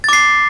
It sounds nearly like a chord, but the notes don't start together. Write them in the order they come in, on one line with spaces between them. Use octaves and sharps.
A6 D6 C7